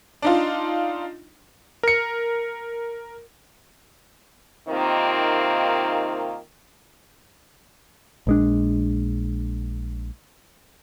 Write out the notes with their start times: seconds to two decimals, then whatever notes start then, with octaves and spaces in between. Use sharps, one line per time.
0.22 D4 D#4 F4
1.83 A#4 C#7
4.68 C3 D#3 A#3 C4 D#4 F4
8.27 A#1 G#3 D4